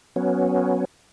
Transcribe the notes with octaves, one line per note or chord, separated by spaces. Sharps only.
F#3 B3 C#4